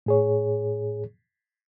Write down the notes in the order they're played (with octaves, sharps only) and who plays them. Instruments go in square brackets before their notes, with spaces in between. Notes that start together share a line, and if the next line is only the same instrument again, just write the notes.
[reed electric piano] A2 G#4 C#5